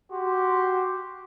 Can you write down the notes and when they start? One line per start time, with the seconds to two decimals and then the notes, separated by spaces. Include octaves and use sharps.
0.11 F#4 G4 C6